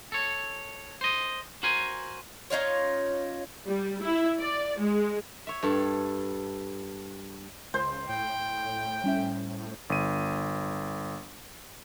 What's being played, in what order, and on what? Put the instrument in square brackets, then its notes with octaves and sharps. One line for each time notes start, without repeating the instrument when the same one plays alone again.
[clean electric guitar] A4 C#5
C5 D#5
F#4 A#4 C5 G#5
[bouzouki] C#4 D#4 F4 C#5
[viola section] G3
E4
D5
G#3
[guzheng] C#5 E5
G2 A4
[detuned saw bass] C#2 [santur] C5
[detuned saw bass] A2 [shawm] G5
[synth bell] G3 C#4 E5
[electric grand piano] G1 D#7